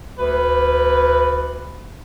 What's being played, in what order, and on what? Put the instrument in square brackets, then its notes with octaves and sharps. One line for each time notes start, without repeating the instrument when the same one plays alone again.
[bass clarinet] D2 [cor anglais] B4